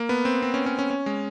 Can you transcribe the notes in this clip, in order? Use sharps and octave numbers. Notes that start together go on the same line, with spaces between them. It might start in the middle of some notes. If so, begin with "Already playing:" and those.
Already playing: A#3
B3
C4
C4
C#4
C#4
C#4
C#4
G#3